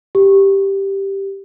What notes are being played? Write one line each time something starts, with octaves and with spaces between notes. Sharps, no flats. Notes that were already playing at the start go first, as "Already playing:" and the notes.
G4